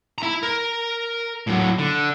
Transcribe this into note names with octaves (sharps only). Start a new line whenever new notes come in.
E4 A#5
A#4
A2 F#3
D3